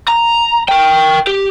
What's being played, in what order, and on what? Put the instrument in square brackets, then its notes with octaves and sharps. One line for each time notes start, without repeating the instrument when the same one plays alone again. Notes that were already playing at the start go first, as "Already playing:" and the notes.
[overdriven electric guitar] A#5
A#4 G5
G4